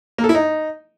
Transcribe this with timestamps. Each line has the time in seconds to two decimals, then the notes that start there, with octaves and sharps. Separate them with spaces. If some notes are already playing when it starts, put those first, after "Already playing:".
0.18 A#3
0.24 A4
0.29 E4
0.35 D#4